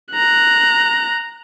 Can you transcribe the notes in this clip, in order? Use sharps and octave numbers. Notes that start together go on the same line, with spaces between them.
A#5 F#6